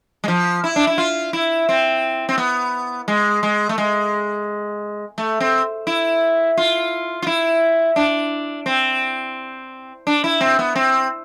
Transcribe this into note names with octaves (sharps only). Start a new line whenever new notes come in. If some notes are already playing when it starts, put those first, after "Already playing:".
G#3
F3
E4
D4
E4
F4
E4
C4
C4
B3
G#3
G#3
A3
G#3
A3
C4
E4
F4
F4
E4
D4
C4
D4
E4
C4
B3
C4